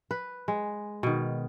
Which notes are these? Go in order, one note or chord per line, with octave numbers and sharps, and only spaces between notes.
B4
G#3
B2 D#3